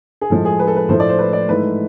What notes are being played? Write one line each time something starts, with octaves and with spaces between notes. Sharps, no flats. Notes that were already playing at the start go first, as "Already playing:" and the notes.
G#4
A2 F3 G#3 A4
G#4
B4
A4
B4
A2 F3 A3 C5
D5
C5
B4
D5
G#2 E3 A3 B4